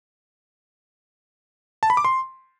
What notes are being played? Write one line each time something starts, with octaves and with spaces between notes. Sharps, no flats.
A5
B5
D6
C6